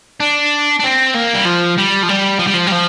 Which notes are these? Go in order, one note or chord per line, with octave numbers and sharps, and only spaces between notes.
D4
D4
C4
A#3
G3
F3
G3
F3
G3
F3
G3
F3
G3
F3